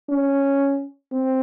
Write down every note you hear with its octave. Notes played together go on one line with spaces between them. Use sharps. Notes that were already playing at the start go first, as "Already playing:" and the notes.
C#4
C4